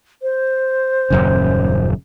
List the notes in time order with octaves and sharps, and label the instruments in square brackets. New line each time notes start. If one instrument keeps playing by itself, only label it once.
[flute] C5
[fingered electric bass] D#1 F#2 C#3